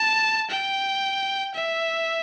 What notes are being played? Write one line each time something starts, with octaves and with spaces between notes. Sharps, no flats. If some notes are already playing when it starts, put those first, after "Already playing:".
Already playing: A5
G5
E5